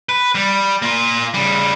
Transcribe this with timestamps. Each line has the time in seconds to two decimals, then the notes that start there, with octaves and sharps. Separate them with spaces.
0.09 B4
0.35 G3
0.82 A#3 F4
1.34 C#3 G3